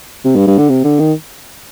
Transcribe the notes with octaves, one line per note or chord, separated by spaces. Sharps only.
C3
G2
G2
D3
C3
D3
D#3